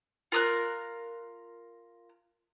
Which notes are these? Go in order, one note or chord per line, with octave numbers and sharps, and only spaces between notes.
F4 A#4 D#6 F#6